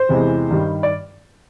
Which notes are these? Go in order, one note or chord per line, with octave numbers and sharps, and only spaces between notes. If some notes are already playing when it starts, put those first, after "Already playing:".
Already playing: C5
E2 C3 E3 G#3
G2 D#3 G3
D5